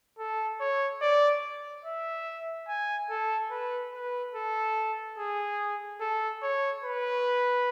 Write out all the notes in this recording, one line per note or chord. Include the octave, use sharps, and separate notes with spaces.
A4
C#5
D5
E5
G#5
A4
B4
B4
A4
G#4
A4
C#5
B4